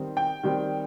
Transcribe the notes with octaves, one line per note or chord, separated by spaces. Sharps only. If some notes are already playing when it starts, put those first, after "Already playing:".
Already playing: D#3 G3 C4
G5
D#3 G3 C4